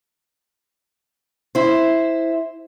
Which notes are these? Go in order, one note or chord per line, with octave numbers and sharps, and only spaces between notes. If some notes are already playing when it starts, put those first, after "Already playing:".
E4 C5